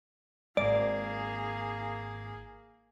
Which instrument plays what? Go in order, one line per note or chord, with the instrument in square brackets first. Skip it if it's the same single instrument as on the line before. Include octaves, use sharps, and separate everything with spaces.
[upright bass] G#1 [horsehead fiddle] A#3 G#4 [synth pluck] D5